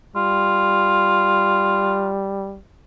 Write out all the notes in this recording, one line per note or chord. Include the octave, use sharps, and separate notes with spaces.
G3 F4